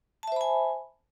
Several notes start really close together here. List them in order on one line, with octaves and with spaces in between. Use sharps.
A5 E5 C5 B5 G#5